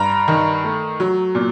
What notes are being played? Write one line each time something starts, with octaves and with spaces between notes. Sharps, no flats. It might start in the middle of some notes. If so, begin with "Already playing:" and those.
Already playing: G2 A#5
D#3
A3
F#3
A#2